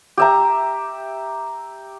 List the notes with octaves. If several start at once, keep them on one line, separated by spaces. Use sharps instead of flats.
G4 E5 A#5